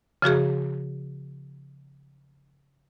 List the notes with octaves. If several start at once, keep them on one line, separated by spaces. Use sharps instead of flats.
C#3 F3 F#4 G#4